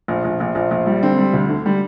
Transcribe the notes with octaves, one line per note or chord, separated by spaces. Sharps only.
A#1
A#1
A#1
A#1
A#1
G3
D3 C4
G3
D2
D3
G3